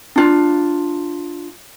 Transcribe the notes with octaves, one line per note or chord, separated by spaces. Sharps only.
D4 F4